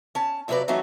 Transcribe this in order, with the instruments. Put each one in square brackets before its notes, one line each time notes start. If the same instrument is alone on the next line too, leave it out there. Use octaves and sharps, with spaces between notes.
[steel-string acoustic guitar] C#4 A5
F2 C3 F#3 F4 B4 D5
E3 F#3 A3 C#4 D#4 F#4